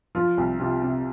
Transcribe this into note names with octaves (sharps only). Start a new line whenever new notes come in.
F3 F4
C2
C3 F4
C3